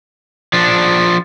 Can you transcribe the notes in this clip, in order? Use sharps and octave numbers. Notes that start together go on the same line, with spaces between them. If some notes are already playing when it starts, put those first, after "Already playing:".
F3 D4